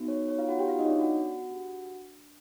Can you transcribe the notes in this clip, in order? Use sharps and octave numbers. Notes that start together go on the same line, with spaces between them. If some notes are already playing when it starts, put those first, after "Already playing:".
Already playing: B3 D#4 F#4
C#5
C#5
F4 F5
F#4 F#5
G4 G5
F4 F5
D#4 D#5
C#5
D4 D5
F#4 F#5
D4 G4